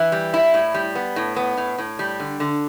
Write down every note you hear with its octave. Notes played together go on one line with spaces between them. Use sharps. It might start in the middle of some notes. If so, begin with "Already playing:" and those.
Already playing: E3
G3
E4
A2
G3
B3
A2
B3
A2
A2
G3
D3
D3